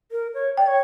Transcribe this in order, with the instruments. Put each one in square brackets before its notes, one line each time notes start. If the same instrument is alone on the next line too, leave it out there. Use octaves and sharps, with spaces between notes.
[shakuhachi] A#4
C#5
[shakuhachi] D5 [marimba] G5
[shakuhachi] C#5